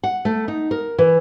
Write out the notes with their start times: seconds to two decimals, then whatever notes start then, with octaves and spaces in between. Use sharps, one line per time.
0.03 F#5
0.25 A3
0.48 D#4
0.71 A#4
0.98 E3